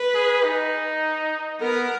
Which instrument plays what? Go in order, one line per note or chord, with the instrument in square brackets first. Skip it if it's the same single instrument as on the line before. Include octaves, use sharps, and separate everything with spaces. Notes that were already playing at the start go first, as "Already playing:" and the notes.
Already playing: [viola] B4
[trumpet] G#4
D#4
[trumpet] B3 [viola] A#4